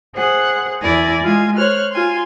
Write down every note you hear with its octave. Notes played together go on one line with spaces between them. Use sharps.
G#4 C5 F#5 F#6
E2 E4 D5 G#5 A#6
G#3 F4 G#5
C5 C#5 F6 F#6
F4 G#5 C6